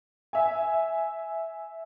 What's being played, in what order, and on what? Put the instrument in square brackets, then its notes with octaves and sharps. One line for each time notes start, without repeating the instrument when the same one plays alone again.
[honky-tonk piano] E5 G#5